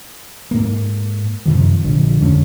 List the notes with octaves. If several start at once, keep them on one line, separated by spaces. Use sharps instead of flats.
G#2 A#3
F#2 C3 D#3 F3
A#1 D3 F3
F2 D3 G#3 C#4